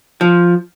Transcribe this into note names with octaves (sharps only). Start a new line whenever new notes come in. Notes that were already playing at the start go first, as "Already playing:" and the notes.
F3